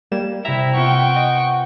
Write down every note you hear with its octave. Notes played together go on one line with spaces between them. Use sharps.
G3 A#3 G#6 E7
C3 E4 E5 G5 A#5
B3 C4 F4 F#5 G5 C#6
D#5